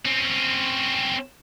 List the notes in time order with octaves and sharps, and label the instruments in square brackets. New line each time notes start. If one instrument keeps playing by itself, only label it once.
[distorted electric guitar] C4 C#4